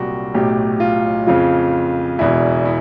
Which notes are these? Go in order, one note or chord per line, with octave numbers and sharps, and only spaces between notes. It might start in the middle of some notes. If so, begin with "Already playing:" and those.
Already playing: C2 A#2 F#3 F#4 G4
B1 A2 F#3 G4
F4
F2 C#3 F3 F4
E1 E2 B2 E4
E4